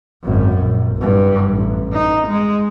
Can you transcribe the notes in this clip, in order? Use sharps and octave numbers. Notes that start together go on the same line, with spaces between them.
G#1 F#2
A#1
F#1 G2
A1
D#4
G#3